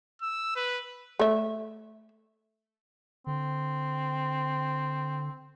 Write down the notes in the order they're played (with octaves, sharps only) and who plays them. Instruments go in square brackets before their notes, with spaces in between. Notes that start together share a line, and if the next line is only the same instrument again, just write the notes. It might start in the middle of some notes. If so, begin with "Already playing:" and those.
[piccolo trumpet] E6
B4
[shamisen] A3 E5
[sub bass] D3 [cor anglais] C4